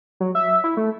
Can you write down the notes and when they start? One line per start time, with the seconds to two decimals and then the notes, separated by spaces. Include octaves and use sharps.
0.20 F#3
0.35 E5
0.64 E4
0.77 A3